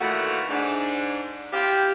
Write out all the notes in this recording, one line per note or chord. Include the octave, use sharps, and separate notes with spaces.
F2 A#2 D#3 E3 A3 F#4
G#2 D4
C4 E4 F4 G4